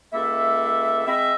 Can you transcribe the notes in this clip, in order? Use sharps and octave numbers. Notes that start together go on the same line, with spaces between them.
C#2 A#3 A4 E5
G#3 C4 D#5 E5